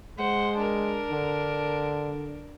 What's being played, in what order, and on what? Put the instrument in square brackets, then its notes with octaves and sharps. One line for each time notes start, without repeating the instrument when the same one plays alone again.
[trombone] G#3 [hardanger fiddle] C5 F#5
[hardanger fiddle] D4 A#4
[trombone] D3